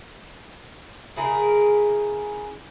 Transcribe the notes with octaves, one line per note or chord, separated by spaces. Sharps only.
C#3 E4 G#4 A#4